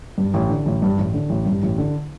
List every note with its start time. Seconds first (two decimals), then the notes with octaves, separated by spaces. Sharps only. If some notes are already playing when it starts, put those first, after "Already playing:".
0.18 G2
0.34 A1
0.50 D3
0.66 A1
0.82 G2
0.99 A1
1.14 D3
1.30 A1
1.46 G2
1.63 A1
1.78 D3